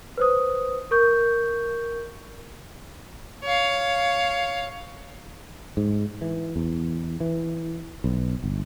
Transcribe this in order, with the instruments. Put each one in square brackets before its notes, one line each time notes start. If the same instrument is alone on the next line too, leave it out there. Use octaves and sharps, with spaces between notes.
[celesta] B4 C5 D#6
A#4 C#6 G6
[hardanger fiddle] C#5 F5
[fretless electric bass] G#2
E3
E2
E3
B1
G1